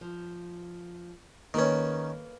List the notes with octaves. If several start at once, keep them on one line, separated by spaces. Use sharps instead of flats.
F3
D#3 A#3 C#4 A4 B4